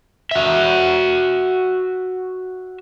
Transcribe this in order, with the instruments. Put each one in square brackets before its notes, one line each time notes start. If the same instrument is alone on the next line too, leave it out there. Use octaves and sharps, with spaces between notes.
[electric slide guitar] F#4 E5